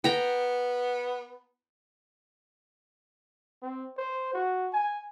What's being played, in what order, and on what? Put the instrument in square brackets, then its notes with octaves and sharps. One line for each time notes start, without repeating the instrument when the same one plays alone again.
[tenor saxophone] B3 [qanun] G5 A#5
[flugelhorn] C4
C5
F#4
G#5